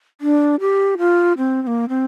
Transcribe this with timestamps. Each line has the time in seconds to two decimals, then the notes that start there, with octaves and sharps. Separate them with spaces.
0.21 D4
0.60 G4
0.98 F4
1.38 C4
1.62 C4
1.67 A#3
1.89 C4